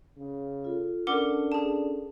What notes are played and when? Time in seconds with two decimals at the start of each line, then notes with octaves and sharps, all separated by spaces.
0.17 C#3
0.65 F4 A4
1.07 C#4 D4 A4 A#4 F#5 D6
1.52 G#4 A5